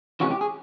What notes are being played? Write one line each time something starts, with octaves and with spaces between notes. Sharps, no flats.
C3 E3 G#3 C#4 F#4
G4
G#4